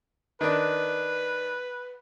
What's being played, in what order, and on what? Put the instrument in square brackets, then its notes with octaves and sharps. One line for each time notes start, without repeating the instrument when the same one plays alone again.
[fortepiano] D#3 D4 [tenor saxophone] B4